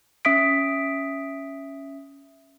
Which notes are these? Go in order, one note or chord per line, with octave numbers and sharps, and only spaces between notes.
C#4 E5 D#6 B6 D7